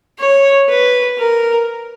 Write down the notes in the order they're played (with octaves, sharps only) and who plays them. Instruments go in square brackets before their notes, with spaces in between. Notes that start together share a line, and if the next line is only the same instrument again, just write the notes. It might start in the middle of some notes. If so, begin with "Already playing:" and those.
[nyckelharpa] C#5
B4
A#4